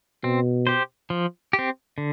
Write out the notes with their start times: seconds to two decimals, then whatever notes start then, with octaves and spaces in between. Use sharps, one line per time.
0.23 B2 C4
0.67 G4 C5
1.10 F3
1.53 G4
1.59 C4
1.98 D3